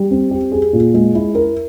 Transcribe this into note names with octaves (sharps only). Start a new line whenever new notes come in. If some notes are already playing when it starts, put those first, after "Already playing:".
Already playing: G3
C4
G4
G#4
A#2
G#3
E4
A#4